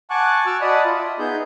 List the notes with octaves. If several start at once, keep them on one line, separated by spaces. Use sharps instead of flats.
F#5 G#5 A5 C#6 D6 F#6
F#4 D6 E6 F6
D5 D#5 F#5 A5 B5 D#6
F4
E5
B3 D#4 G#4 G6